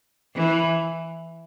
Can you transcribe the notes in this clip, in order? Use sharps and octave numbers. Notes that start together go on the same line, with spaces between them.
E3